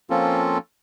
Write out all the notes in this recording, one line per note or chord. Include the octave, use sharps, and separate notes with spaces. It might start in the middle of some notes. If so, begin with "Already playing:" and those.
F3 A#3 C4 C#4 F4 A4